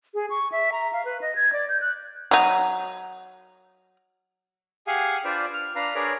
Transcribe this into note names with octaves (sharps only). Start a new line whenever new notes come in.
G#4
C#6
E5
A#5
F5
B4
D#5
G#6
D5
G6
F#6
F#3 D#4
G4 G#4 F5 F#5 G#5
D4 F4 B4 C5 D5
F6
D4 B4 F5 A#5
D4 G#4 A#4 B4 C#5 D5